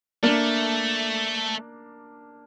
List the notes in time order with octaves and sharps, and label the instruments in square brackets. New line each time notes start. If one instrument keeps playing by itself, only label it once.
[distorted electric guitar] A3 [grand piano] A#3 D4